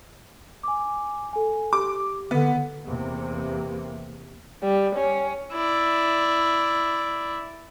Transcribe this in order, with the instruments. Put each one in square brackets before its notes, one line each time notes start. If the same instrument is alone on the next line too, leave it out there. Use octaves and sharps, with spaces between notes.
[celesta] G#5 D6
A4 G#5
[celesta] G4 [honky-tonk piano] D6
[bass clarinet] D3 [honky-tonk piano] B3
[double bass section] E2 C3 A#3
[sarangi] G3
C#4
[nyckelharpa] E4 D5